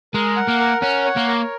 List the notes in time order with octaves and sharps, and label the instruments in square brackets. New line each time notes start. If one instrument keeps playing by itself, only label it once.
[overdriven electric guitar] G#3 [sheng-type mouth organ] A#4
[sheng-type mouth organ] F#5
[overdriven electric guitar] A#3
[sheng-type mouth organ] A#4
[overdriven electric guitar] C#4 [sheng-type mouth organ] F#5
[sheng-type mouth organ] C#5
[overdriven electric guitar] A#3
[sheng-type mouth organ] A#4